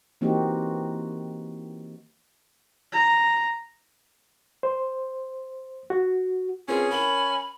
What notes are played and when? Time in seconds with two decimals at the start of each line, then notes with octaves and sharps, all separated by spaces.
0.21 E3 A#3 C4 D#4 F#4 G4
2.92 A#5
4.63 C5
5.90 F#4
6.68 C4 C#4 F4 G#4 B4
6.91 A#4 F#5 B5